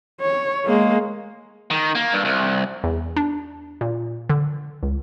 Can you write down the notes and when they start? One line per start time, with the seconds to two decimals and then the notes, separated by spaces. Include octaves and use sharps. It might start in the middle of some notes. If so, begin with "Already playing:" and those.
0.21 C#5
0.66 G#3 A#3
1.71 D#3
1.95 A#3
2.13 G2
2.25 C2
2.84 E2
3.16 D4
3.81 A#2
4.29 D3
4.83 C#2